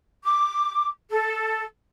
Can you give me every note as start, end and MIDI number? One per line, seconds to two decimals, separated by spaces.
0.23 0.88 86
1.09 1.62 69